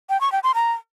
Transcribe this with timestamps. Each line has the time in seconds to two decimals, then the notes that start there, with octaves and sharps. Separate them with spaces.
0.10 G5
0.21 C#6
0.32 G5
0.43 C6
0.55 A#5